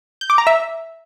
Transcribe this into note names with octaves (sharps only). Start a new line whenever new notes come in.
G6
D6
A#5
E5